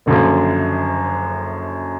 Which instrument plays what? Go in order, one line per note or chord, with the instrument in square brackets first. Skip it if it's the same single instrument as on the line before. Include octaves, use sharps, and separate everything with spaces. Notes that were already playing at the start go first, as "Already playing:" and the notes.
[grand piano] F#1 F#2 D3 F3